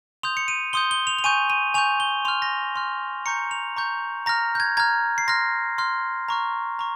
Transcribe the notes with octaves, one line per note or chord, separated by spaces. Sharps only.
C6 D#6 G6 F7
C#7
D#7
C6 D#6 G6 G7
G7
F7
F7
G#5 C#6 G6 D#7
D#7
G#5 C#6 G6 F7
G7
C6 F6 F7
A#6
C6 F6
A#5 C#6 G6 C#7
F7
A#5 C#6 G6
A#5 F6 A#6
G6
G#6
A#5 F6 G#6
C7
C6 F6 A#6
C6 F6
A#5 C#6 F6
A#5 C#6